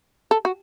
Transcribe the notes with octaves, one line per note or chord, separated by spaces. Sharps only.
A4
F#4